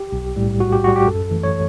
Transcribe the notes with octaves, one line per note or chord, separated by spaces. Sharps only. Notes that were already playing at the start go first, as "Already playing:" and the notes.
Already playing: G4
B1
A2 G3
B1 F#4
G4
A2 G3 F#4
G4
F#2 A4
E3 A3
C#5